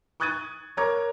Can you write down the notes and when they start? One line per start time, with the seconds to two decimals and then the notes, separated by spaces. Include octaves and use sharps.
0.20 C#6 D#6 F#6 G#6 A6 D#7
0.77 A#4 C#5 A#5 C#6 D6 G#6